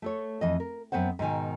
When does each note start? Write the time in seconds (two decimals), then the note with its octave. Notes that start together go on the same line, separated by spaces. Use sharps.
0.02 A3 A4 C#5
0.41 F2 E3 D#5
0.60 A#4
0.92 F#2 B3 C4 C5 F#5
1.19 G#2 B2 D#3 G#5